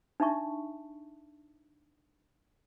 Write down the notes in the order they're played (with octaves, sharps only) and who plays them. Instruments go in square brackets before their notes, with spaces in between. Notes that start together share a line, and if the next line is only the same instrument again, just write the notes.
[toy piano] D4 D#4 E5 A5 C#6